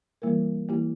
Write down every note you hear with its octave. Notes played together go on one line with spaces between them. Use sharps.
E3 G3 A#3 E4 A#4
E3 A#3 E4 G4